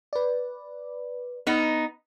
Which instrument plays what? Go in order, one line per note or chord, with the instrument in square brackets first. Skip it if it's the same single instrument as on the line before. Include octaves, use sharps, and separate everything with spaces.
[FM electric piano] B4 D5
[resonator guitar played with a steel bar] B3 D#4